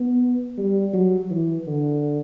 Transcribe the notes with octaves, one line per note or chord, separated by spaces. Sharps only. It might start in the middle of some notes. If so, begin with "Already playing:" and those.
Already playing: B3
G3
F#3
E3
D3